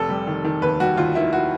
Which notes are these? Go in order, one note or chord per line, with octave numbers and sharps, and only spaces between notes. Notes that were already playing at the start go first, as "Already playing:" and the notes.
Already playing: F1 A4
G3
D#3
D#3
D#2 B4
G3 F#4
D#2 F4
D#3 E4
F#4